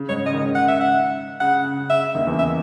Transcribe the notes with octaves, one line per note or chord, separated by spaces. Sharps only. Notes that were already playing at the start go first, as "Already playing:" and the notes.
Already playing: C#3
G#2 G#3 C#5
C#3 D#5
D#3
C#3
F#5
E5
F#5
C#3 F#5
C#3
C#3 E5
D#2 D#3
E2 E3
E5